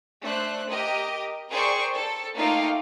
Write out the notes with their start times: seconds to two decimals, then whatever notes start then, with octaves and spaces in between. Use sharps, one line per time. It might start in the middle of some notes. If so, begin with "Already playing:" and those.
0.23 A3 D4 C5 F#6
0.69 G4 A#4 D#5
1.51 G#4 A#4 C5 D5 G5 C#6
1.95 A4
2.35 A3 A#3 D#4 F4 F5 G5